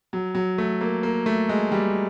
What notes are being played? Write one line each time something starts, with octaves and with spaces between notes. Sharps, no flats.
F#3
F#3
A3
A#3
A#3
A3
G#3
G3